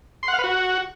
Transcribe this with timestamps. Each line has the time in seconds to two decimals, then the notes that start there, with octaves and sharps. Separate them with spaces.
0.23 C6
0.28 F#5
0.33 F5
0.39 B4
0.44 F#4